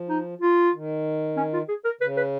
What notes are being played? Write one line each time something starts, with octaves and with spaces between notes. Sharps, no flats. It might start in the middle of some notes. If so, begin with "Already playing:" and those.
Already playing: F3
D#4
F4
D#3
C#4
F4
G#4
A#4
C#3 B4
B4